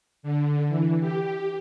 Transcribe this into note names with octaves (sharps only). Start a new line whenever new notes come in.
D3
E3
G4